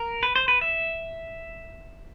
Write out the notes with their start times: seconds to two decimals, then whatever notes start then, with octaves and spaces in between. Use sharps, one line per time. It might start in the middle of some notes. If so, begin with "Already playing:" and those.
Already playing: A#4
0.23 B4
0.36 C5
0.48 B4
0.61 E5